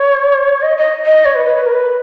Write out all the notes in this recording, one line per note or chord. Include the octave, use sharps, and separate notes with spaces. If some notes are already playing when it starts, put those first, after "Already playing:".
Already playing: C#5
D#5
D#5
D#5
C#5
B4
B4
B4
A#4
B4